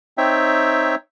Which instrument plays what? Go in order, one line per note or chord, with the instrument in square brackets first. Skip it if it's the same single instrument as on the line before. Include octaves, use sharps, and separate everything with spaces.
[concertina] C4 D#4 C#5 E5 G5